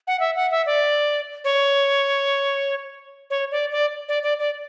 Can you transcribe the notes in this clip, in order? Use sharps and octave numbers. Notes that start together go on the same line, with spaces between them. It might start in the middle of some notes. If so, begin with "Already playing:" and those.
F#5
E5
F#5
E5
D5
C#5
C#5
D5
D5
D5
D5
D5